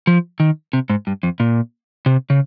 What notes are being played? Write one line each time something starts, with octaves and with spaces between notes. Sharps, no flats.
F3
D#3
C3
G#2
G2
F2
A#2
C3
C#3